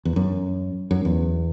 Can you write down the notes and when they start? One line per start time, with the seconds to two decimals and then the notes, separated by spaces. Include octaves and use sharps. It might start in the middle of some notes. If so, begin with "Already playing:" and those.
0.05 E2
0.16 F#2
0.91 F#2
1.05 E2